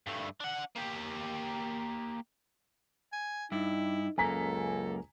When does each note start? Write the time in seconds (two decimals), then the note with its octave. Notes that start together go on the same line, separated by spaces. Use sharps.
0.07 G2 A3
0.40 D4 F#5
0.76 A#3 G4
3.12 G#5
3.52 G2 D#4 E4
4.18 C#2 F#2 A#3 A4 G#5 A#5 B6